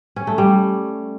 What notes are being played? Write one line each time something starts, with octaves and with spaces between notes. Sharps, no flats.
C#4
A3
G3